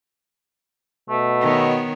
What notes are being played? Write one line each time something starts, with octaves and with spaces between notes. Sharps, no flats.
B2 A3
D#3 B3 C#5